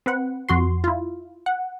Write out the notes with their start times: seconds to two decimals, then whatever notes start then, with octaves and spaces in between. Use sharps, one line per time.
0.06 C4 B4 F#5
0.49 F2 F#4 C6
0.84 E4 F4
1.46 F#5